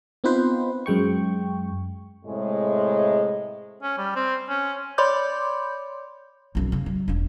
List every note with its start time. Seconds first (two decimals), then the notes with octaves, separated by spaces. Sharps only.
0.24 B3 C4 D#4 F4 B4 C5
0.86 F#2 G#3 G5 C#6
2.25 A2 C3 G#3
3.83 C#4
3.98 G3
4.16 C4
4.49 C#4
4.98 C#5 D5 B5 C6 D6 G6
6.55 B1 F#2
6.72 C#3
6.86 F#3
7.08 E1 D4